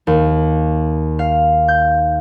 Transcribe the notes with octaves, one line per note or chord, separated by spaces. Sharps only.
D#2
F5
G6